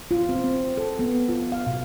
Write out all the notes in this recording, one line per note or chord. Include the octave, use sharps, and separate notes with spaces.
F4
C4
C4
A4
B3
F4
F5
B2